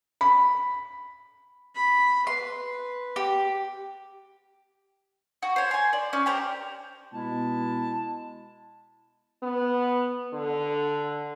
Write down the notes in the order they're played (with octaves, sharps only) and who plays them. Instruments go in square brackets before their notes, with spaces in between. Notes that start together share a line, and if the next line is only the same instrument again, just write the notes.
[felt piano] B5
[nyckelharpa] B5
[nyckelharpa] B4 [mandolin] C6
[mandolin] G4
F#4
C5 C#5
G#5 C6
D5
C#4
G4 A#4 C5
[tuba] B2 [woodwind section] G#3 E4 [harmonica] A5
[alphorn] B3
D3